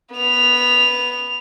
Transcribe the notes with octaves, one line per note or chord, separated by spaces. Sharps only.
B3 F7